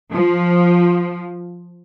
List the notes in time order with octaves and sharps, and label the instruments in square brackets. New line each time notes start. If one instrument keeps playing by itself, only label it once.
[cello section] F3